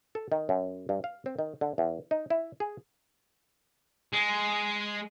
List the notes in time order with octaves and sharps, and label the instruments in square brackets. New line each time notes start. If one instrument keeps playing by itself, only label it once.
[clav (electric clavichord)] A4
D#3
F#2
G2
F5
C4
D#3
D3
E2
D#4
E4
G#4
[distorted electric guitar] G#3